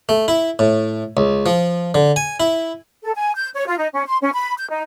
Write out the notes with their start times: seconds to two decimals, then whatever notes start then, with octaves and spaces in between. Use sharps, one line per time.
0.09 A3
0.28 E4
0.59 A2
1.17 C#2
1.46 F3
1.95 D3
2.16 G#5
2.40 E4
3.04 A4
3.15 G#5
3.36 G6
3.54 C#5
3.66 F4
3.78 D#4
3.93 C#4
4.07 C6
4.22 C#4
4.34 B5
4.57 G6
4.70 D#4